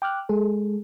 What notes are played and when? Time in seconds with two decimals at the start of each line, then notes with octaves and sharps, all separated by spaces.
0.02 G5 D6 F6 F#6
0.29 G#3 G#4 A4